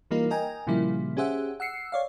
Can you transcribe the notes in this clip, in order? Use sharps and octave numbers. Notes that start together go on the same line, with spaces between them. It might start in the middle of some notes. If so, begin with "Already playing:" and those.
E3 G3 A#3 D#4 F4 A#4
A#4 D#5 G5 G#5 A#5
A#2 C#3 F3 G3 A#3 E4
C#4 G4 G#4 C5 E5 F#5
F#5 E6 C7 C#7
C#5 D5 F5